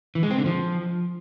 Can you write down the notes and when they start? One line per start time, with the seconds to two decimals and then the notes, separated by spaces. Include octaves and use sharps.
0.15 E3
0.23 G#3
0.31 C4
0.38 D3
0.46 F3